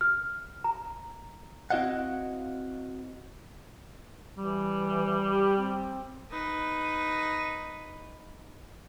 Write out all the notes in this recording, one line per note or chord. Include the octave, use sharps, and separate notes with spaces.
F6
A#5
C4 E4 F#4 D#5 F5 F#5
E3 G3
G4
C4
D#4 B4